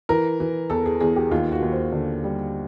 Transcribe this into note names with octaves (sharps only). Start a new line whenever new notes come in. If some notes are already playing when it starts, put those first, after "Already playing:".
E3 A#4
E3
E2 A4
G#4
E2 G#4
G4
D#2 F4
F#4
D#2
C5
D3
G3